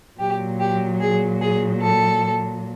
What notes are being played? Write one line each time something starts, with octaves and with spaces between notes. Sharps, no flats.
A#2 F#3 G4
G4
G#4
G#4
A4